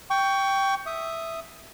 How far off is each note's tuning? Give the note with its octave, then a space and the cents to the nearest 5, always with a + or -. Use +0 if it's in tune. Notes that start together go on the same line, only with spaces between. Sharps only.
G5 +0 C#6 +20
E5 +0 D#6 +0